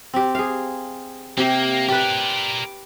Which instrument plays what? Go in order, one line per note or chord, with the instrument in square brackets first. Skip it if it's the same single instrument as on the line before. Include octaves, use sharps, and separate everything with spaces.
[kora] C4 G4
G#4 F5
[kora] C3 G4 [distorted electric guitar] A#3
[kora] G4 B4 [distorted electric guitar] A#4 D5